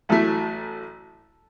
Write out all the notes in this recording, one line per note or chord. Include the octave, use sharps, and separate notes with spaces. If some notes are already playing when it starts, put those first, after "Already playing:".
A1 A2 F#3 A3 A4